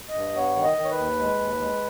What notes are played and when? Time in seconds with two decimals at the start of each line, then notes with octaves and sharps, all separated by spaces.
0.09 D#5
0.15 G2
0.36 B3 C#5
0.56 D#3
0.63 D#5
0.78 D#3
0.85 C#5
0.91 B4
0.98 D#2
1.19 G#3
1.39 D#2
1.61 G#3